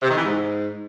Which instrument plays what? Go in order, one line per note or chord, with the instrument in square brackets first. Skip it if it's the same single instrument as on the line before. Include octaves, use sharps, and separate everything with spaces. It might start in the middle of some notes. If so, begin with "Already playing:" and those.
[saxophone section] C3
D#3
E3
G#2